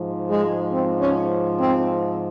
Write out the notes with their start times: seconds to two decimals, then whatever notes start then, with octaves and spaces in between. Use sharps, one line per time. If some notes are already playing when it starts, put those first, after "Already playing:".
Already playing: G#2 F3
0.29 G#3
0.72 C4
1.00 C#4
1.58 C4